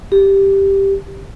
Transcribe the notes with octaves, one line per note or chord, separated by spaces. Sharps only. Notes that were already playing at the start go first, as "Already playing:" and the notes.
G4